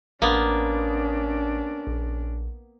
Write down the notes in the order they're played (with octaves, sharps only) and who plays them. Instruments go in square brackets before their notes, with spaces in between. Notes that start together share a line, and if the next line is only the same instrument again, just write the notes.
[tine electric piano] A1 [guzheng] A#3 B3 [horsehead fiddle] C#4 D4
[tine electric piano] A#1